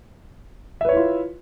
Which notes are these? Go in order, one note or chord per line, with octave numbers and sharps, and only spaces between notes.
E4 F4 B4 C#5 E5